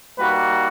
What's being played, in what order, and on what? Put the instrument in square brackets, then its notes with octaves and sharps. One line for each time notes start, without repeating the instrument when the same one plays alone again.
[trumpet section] G3 A#3 D#4 F#4 B4